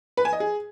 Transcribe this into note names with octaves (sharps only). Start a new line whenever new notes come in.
B4
G#5
D#5
G#4